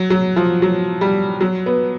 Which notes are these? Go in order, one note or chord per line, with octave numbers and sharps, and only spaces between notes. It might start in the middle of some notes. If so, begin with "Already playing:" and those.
Already playing: F#3
F#3
F3
F#3
G3
F#3
B3